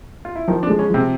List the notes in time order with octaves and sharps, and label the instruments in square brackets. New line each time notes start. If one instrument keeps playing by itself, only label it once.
[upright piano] F4
E4
[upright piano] D#3 D#4 [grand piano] F3
[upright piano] D3 D4
[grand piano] G#3
[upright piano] C#3 C#4
[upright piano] C3 C4 [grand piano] F3